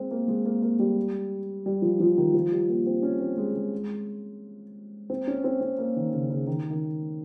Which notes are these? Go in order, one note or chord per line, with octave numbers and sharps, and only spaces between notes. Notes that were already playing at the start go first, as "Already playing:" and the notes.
Already playing: G#3 C4
A#3
G#3
A#3
A#3
G3
G3
F3
F3
D#3
F3
G3
A#3
C4
C#4
C4
G#3
G#3
C4
C#4
C4
C4
A#3
D#3
C#3
C#3
D#3
D#3